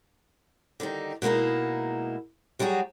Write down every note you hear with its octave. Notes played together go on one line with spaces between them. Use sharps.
D3 D#3 G3 D#4
B2 G#3 A#3 D#4 E4
F#3 G3 E4 F#4 G#4